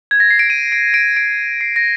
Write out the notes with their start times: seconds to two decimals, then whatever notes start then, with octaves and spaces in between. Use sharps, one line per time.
0.11 G#6
0.20 A#6
0.30 C7
0.39 D7
0.50 D#7
0.72 D7
0.94 D7
1.17 D7
1.61 C7
1.76 A#6